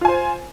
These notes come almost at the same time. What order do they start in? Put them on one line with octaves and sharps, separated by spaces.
F4 G#5 C5